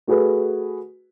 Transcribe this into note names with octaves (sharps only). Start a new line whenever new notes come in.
A3 F#4 G#4 B4